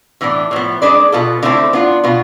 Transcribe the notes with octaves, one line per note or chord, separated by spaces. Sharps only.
A2 E3 B3 D4
A2 F3 B3
G#3 D4 G#4 B4 D5
B2 B3 F4 A4
D3 A3 C4 E4
B3 D4 F4
B2 B3 F4